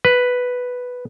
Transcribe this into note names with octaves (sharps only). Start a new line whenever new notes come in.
B4